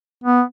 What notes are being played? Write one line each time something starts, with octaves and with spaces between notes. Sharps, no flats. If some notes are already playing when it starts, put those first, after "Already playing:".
B3